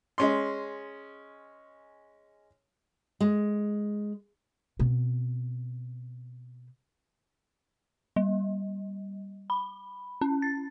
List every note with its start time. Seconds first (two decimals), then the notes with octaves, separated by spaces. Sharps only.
0.18 G#3 C#4 C6
3.20 G#3
4.79 B2 C4
8.16 G3
9.50 B5
10.21 C#4
10.42 A6